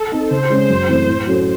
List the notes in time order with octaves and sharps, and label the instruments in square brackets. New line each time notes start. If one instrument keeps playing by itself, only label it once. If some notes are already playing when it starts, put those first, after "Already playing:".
Already playing: [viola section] A4
[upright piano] C4 D#4
[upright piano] C#3 [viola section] C5
[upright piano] G#3 C#4 G#4
F#2
E3 A3 C4
A2
F#3 C#4 F#4 A4